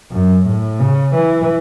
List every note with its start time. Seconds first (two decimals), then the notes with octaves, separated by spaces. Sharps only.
0.11 F#2
0.46 A2
0.80 C#3
1.15 E3